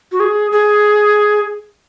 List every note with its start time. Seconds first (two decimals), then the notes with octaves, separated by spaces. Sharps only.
0.12 F#4
0.20 G#4
0.52 G#4